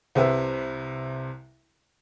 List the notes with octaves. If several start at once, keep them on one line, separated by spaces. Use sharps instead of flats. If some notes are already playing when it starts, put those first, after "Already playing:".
C2 C3 B4 E5